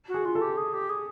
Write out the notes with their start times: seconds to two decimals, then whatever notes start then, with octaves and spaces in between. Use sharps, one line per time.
0.08 F#4
0.14 G#4
0.25 F4
0.35 A4
0.41 G4
0.57 G#4
0.73 G4
0.89 G#4